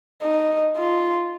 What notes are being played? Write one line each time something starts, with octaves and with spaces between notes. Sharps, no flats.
D#4
F4